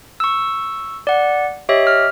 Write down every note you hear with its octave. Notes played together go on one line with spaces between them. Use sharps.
C#6 E6
D5 F#5
G4 C#5 D#5 E5
F6